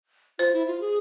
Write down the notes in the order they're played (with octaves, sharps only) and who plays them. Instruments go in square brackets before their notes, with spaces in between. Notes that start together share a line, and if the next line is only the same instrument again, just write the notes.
[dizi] F4 [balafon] C5
[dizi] E4
F4
G#4